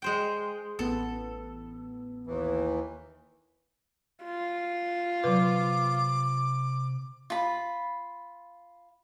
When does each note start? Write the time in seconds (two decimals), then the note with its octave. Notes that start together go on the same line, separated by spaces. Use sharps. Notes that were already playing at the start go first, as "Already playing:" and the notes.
0.02 G#3 C5 G5
0.79 A1 B3 A4
2.27 D#2 E3
4.25 F4
5.24 C3 F#3 B4 D6
7.30 F4 B5